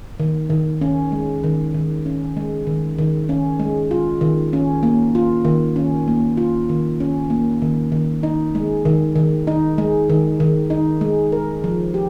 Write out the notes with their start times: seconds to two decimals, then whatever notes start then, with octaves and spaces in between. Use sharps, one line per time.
0.20 D#3
0.50 D#3
0.81 C#4
1.12 G#3
1.44 D#3
1.74 D#3
2.06 C#4
2.37 G#3
2.67 D#3
2.98 D#3
3.29 C#4
3.59 G#3
3.91 F4
4.21 D#3
4.53 C#4
4.83 A#3
5.15 F4
5.45 D#3
5.76 C#4
6.08 A#3
6.37 F4
6.69 D#3
7.00 C#4
7.30 A#3
7.62 D#3
7.92 D#3
8.23 D#4
8.55 G#3
8.85 D#3
9.16 D#3
9.47 D#4
9.78 G#3
10.10 D#3
10.40 D#3
10.70 D#4
11.01 G#3
11.32 A#4
11.64 F3
11.94 G4